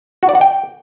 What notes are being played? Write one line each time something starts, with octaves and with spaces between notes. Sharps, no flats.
F#4
D5
F#5
G5